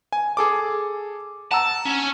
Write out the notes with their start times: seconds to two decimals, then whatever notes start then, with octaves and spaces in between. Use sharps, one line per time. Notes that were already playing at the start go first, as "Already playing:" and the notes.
0.13 G#5
0.37 G#4 A4 D6
1.52 F#5 A5 A#5 E6
1.85 C#4